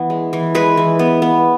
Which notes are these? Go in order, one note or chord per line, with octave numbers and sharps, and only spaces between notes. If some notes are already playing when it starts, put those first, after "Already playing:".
Already playing: E3 B3
G#3
E3
G#3 B4
E3
B3
B3